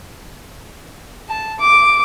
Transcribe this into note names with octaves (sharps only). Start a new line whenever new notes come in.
A5
D6